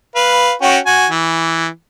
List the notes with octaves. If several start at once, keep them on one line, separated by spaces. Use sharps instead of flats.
B4 F5
C#4 F#4 G5
F#4 G#5
E3